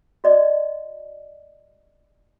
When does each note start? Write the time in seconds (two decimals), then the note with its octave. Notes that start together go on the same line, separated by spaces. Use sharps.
0.24 F#4 D5 D#5